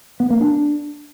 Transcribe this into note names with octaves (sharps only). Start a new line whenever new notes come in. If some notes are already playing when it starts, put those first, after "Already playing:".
B3
A#3
D4